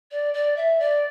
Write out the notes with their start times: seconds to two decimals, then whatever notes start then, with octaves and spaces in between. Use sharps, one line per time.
0.11 D5
0.34 D5
0.57 E5
0.79 D5